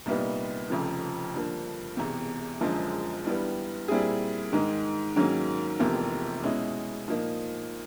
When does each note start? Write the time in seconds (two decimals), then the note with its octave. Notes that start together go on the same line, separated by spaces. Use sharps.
0.06 C2 A#2 G3 B3 D#4
0.70 F1 F2 C#3 F3
1.34 G2 D3 F3 A#3 D4
1.97 E1 E2 C3
2.61 F#1 F#2 D3 F3 G#3
3.25 G2 E3 G3 B3
3.88 A#2 G3 C4 E4 G#4
4.53 G#2 D#3 G#3
5.16 G#2 D#3 F#3 A#3 C#4
5.79 F1 E2 C3 F3 A#3
6.43 B2 G#3 C#4 E4
7.08 A#2 F3 A#3 D#4